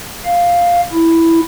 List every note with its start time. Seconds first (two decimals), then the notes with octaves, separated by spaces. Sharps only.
0.25 F5
0.92 E4